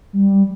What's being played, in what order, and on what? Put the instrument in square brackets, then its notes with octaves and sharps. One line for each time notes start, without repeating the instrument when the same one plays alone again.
[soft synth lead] G3